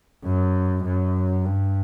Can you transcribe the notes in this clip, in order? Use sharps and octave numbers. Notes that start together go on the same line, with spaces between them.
F#2
F#2
G2